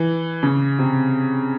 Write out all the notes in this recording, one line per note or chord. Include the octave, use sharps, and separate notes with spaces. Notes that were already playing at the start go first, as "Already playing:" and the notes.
Already playing: E3
C#3
C3